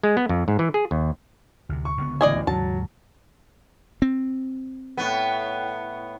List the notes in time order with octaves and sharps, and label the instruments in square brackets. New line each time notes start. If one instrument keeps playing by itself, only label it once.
[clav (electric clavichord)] G#3
B3
F2
G#2
E3
G#4
D#2
[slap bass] D2 C3
[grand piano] C#6
[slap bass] C#2 D3 B3
[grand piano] A1 D2 [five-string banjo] D5 D#5 G#5
[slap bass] D#2 G#2 C#3 [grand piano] F#3 [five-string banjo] A5
[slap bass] C4
[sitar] A2 B3